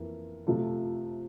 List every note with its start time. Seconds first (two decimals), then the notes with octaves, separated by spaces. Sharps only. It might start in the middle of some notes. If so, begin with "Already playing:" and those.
Already playing: F2 E3 A#3 E4
0.47 C3 F3 A3